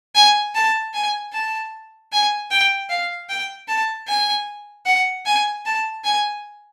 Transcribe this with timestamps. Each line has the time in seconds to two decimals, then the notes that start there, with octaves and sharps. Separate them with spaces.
0.15 G#5
0.55 A5
0.94 G#5
1.33 A5
2.12 G#5
2.51 G5
2.90 F5
3.29 G5
3.68 A5
4.08 G#5
4.86 F#5
5.26 G#5
5.65 A5
6.04 G#5